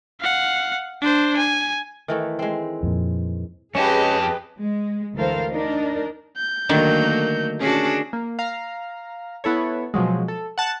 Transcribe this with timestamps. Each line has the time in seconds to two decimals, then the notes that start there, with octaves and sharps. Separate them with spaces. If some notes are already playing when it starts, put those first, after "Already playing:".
0.21 F5 F#5
1.02 D4 C5
1.36 G#5
2.08 D#3 E3 A3
2.39 G#3 C4
2.83 F2 A#2
3.75 F2 G#3 C#4 G4 G#4 B4 D#5 A5
4.60 G#3
5.15 D2 E3 A4 A#4 C5 F5
5.50 D4 D#4 A#4
6.37 G6
6.69 D3 D#3 F#3 A3 A#3
7.60 C#4 D4 F#4 G#4
8.13 A#3
8.39 F5 A#5
9.44 B3 E4 A4 C#5
9.94 B2 F3 F#3 G#3
10.28 A4
10.58 F#5 A5 F#6